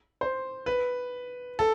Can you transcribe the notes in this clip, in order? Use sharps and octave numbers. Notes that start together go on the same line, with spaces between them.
C5
B4
A4